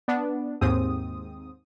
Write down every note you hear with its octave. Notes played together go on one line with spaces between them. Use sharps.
B3 D4
D#2 G#2 C4 D#6